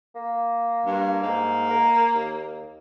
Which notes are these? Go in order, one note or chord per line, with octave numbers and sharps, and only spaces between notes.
A#3
G2
G#2 A#3
A#4
D#2